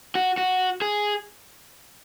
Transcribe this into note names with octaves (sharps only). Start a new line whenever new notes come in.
F#4
F#4
G#4